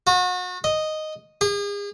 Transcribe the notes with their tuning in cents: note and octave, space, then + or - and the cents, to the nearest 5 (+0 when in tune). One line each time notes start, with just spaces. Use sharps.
F#4 -35
D#5 -5
G#4 -40